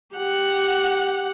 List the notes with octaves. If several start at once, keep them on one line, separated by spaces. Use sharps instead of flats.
G4 F#5